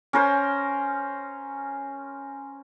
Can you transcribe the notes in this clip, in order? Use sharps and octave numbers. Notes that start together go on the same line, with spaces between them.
C#4 A#4 C5